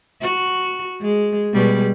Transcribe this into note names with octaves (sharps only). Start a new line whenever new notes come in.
F#4
G#3
B2 G3 G#3